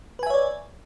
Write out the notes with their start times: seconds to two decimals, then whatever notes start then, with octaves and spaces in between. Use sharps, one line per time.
0.19 B4
0.23 G#5
0.27 E5
0.30 C#5
0.34 D5